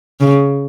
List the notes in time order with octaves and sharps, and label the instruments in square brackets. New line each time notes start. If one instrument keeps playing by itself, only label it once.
[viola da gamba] C#3